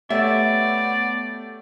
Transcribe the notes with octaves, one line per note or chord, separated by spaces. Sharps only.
A3 B3 G4 C#5 D5 E5